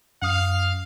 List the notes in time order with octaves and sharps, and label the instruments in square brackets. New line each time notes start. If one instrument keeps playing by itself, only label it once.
[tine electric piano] F#2 D#6 F6 [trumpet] F5